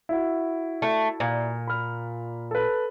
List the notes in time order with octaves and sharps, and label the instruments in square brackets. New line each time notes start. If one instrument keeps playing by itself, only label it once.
[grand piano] E4 F#4
[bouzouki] A3
A#2
[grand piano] B5 F6
A4 B4